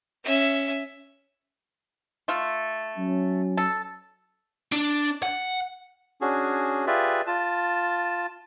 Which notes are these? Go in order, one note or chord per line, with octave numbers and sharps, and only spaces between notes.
C#4 E5
A3 F4
F#3 C#4
A4
D4
F#5
C#4 D4 F#4 G#4
F4 G4 G#4 B4 D5 E5
F4 A5